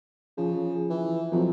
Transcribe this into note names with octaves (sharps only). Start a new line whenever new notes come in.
C#3 F3
E3
F2 F3 F#3 C4